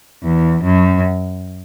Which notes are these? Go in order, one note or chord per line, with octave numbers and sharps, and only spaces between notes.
E2
F#2